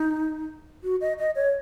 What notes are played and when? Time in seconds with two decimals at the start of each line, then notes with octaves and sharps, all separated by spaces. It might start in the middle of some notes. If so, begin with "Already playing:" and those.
Already playing: D#4
0.84 F#4
1.01 D#5
1.19 D#5
1.36 C#5